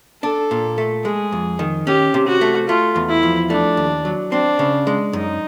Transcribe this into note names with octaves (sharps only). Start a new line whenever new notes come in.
D4 A4
A#2
A3
G#3 G#4
F2
D#3
C#4 G4
C3
F#4
A3
A3 F4
E2
E4
F3
A3 D4
D#2
F#3
C4 D4
C#3
G#3
F#2 D#4